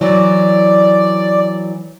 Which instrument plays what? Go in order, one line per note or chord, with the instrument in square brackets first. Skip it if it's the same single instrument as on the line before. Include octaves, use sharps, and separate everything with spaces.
[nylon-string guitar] E3 F#3 [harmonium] D5